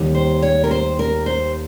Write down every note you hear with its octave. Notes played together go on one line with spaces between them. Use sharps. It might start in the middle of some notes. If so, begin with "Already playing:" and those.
Already playing: D#2 D#3 G3
C5
C#5
A#4
C5
A#4
C5